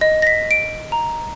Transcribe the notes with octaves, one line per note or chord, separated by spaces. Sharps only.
D#5
A#6 B6
D7
A#5